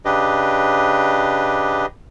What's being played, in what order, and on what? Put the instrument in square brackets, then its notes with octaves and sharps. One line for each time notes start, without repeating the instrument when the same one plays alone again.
[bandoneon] C#3 D4 G4 B4 D#5